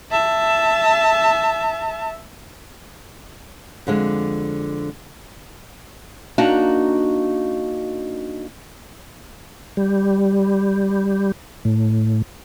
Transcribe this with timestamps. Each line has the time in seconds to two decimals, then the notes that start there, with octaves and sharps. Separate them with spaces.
0.11 E5 A5
3.87 F2 D3 G#3
6.38 A#3 D4 D#4 F#4 A#5
9.77 G3
11.65 A2